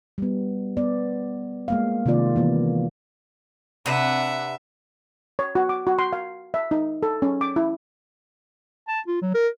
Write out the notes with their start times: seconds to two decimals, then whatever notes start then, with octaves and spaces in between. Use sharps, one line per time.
0.18 G3 B3
0.77 B3 D5
1.68 G#3 A#3 F5
2.06 C3 D#3 A#3 F4 D5
2.36 E3 A#3 B3
3.86 C3 D4 B4 E5 F#5
5.39 C#5
5.55 F#4
5.69 D6
5.87 F#4
5.99 C6
6.13 F5
6.54 E5
6.71 D#4
7.03 A4
7.22 C#4
7.41 D6
7.56 E4
8.88 A5
9.07 F4
9.22 F#3
9.35 A#4